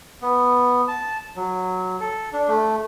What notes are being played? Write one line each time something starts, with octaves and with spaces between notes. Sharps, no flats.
B3
A5
F#3
A4
D4
A3